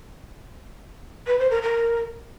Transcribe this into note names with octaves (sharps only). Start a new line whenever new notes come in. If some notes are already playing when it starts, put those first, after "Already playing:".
B4
C5
A#4
A#4